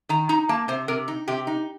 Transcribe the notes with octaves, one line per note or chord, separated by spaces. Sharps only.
D#3 A#5
D#4 A#5
A#3 A5
C3 C5
C3 A#4
D#4
C3 G4
D#4